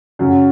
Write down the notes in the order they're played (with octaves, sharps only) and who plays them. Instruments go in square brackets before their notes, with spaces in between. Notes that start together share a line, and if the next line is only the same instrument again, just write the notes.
[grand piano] F#2 C#3 F#3 C#4